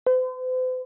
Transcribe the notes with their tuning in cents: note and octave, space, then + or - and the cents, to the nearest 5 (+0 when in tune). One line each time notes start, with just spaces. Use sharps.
C5 -45